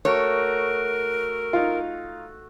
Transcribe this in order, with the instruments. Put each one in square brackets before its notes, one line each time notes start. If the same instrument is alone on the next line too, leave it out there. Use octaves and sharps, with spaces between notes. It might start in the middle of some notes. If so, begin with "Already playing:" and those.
[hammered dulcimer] A3 F#4 [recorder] A#4 [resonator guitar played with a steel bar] C#5
[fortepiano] D#4 F4